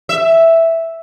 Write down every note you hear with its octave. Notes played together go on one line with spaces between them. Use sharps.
E5